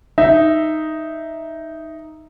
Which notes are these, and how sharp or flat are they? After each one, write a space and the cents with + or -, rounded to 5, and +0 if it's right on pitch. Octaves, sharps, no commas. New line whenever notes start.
D#4 +0 E5 +0